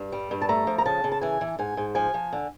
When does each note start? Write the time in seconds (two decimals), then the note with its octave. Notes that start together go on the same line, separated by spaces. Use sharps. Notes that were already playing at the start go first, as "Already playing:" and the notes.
Already playing: G2
0.12 G3
0.31 G2
0.42 A5
0.49 A3 A#5
0.67 F3
0.78 A#5
0.85 C#3 A5
1.04 C#3
1.12 A5
1.21 E3 G#5
1.41 E3
1.59 G#2 G#5
1.77 G#2
1.95 F3 G#5
2.14 F3
2.33 D3